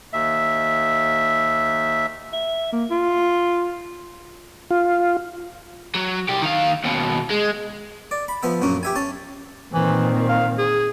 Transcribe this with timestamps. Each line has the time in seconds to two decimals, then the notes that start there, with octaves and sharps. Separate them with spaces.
0.13 D#2 E5
2.33 E5
2.73 A#3
2.90 F4
4.71 F4
5.95 F#3
6.29 C2 G4
6.42 D#3 F5
6.84 D#2 B2
7.30 G#3
8.11 D5
8.28 B5
8.43 F3 B3 E5
8.62 A#1 F#2 A#3 C#4
8.83 G4 E5 G#5
8.96 C#4 A5
9.73 A#2 D#3 E3 C4
10.29 F5
10.58 G#4